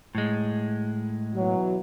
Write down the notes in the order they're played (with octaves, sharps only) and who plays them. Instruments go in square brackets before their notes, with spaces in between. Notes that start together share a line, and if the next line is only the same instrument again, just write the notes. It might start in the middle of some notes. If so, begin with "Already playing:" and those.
[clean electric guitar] A2 G#3
[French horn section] B2 E3 F#3